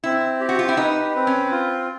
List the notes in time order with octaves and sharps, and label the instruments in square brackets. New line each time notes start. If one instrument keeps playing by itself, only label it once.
[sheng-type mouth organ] C4 [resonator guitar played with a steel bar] E4
[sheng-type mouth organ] G4
[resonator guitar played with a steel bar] F#4
F4
E4
[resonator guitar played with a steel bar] D#4 [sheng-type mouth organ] B4
[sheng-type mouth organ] C4
[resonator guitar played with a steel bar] C#4
[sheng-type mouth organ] F4